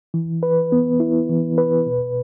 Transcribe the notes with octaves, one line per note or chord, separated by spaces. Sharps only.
E3
B4
B3
E4
E3
B4
B2